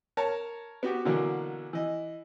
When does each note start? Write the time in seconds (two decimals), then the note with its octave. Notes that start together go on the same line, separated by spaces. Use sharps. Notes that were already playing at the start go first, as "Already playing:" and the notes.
0.17 A#4 C#5 A5
0.83 B3 F#4 G4
1.05 B2 D3 E3 F#3 A#3
1.73 E3 D#5